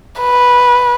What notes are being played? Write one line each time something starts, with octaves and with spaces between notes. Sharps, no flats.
B4